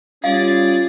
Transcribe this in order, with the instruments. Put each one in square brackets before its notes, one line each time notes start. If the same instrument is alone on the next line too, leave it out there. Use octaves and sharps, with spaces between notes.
[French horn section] G3 C#4 F4 [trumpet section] G#4 D5 [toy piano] F5